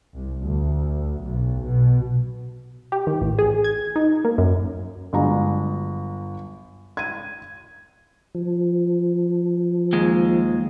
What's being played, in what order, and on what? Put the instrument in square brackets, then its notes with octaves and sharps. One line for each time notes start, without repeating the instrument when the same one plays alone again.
[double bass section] C2
D2
B1
B2
[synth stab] G4
D#3
A1
G#4
G#6
D#4
A#3
F#2
[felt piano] G1 F#3 G#3 A#5
G#6 D#7
[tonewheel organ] F3
[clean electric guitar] D#2 G#3